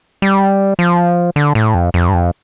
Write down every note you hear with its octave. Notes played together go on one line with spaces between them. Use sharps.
G3
F3
D3
A2
F2
F2
G2
F2